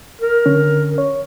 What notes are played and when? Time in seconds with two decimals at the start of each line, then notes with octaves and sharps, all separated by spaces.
0.22 A#4
0.46 D3 C#4
0.98 C#5